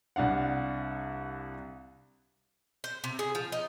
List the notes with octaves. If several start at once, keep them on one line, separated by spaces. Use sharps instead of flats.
C2 D4 F5 F#5
C5
C3
G#4
F3
D#4